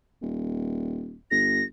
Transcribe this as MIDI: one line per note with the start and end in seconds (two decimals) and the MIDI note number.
0.22 1.17 27
1.31 1.63 31
1.31 1.64 94